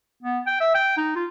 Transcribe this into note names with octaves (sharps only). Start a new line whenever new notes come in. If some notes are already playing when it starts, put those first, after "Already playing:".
B3
G5
E5
G5
D#4
F4